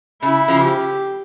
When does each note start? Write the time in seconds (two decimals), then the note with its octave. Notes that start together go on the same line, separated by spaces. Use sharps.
0.22 C#3 E4
0.48 C#3 F3
0.61 G4